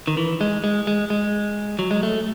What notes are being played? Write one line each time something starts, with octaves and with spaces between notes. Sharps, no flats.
D#3
E3
G#3
G#3
G#3
G#3
F#3
G#3
A3